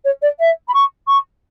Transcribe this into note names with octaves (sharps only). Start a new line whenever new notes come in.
C#5
D5
E5
B5
C#6
C#6